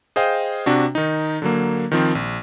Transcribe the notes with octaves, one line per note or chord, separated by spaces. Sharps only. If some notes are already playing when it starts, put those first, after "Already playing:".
G#4 C5 D#5 F5 G5
C3 D4 F#4
D#3 D#4
D3 F#3 A#3
D#3 F3 C4
A#1